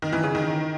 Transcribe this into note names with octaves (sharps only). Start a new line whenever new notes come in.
D#3
E3
C#3
D#3